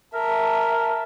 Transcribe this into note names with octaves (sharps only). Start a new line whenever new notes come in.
A#4 E5 A5